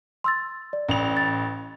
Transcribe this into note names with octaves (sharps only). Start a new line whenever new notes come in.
C6 E6 A6
D5
A1 F7
A6